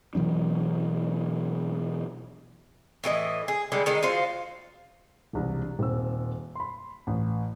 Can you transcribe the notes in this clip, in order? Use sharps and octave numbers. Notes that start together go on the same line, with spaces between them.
B2 E3 F#3 D4
A2 E3 G#4 D#5
G#4
D3 G3 G#3 A4
D#3 G#3 D#4
F4 F#4 C5 F5
E1 C2 D4
D#1 C4 E6
B5 C6
A1